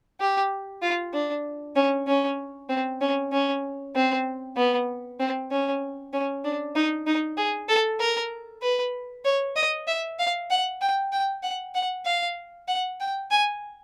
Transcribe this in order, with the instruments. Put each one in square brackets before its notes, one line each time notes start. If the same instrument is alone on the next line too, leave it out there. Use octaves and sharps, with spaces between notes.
[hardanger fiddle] G4
F4
D4
C#4
C#4
C4
C#4
C#4
C4
B3
C4
C#4
C#4
D4
D#4
D#4
G#4
A4
A#4
B4
C#5
D#5
E5
F5
F#5
G5
G5
F#5
F#5
F5
F#5
G5
G#5